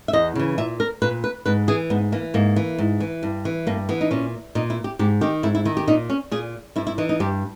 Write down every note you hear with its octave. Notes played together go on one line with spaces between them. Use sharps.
E5
E2 D#5
C#3 E3
A#2 E5
A#4
A#2 B4
B4
G#2 B4
E3 G#4
G#2 B3
E3 A#3
G#2 A#3
E3
G#2
E3
G2
E3
G2 A#3
E3 B3
D#4
A#2 C#4
A#2 D#4
E4
G4
G#2 G4
D#3 G4
G#2 E4
E4
D#3 E4
G4
A#2 D#4
C#4
A#2 G#4
G2 E4
E4
E3 D#4
D#4
G2 G4